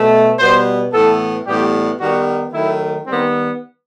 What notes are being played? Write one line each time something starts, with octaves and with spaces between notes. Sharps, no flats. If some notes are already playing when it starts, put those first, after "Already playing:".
Already playing: B2 A3
B2 G3 B3 C5
A2 E3 B3 A4
A2 E3 G3 B3 G4
D#3 G3 B3 F#4
D#3 F#3 A3 E4
D#3 G3 B3 C4